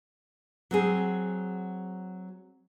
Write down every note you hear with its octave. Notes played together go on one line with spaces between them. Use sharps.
F#3 C4 G#4